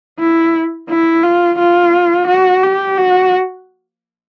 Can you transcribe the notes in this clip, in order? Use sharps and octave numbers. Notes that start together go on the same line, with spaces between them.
E4
E4
F4
F4
F#4
G4
F#4